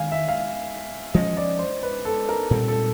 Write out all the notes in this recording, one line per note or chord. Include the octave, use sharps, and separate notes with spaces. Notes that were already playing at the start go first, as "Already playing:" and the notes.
Already playing: D#3 F5 G#5
E5
F5
F3 G#3 C#4 D#5
D5
C5
B4
A4
A#4
A#2 G3 C4 A4
A4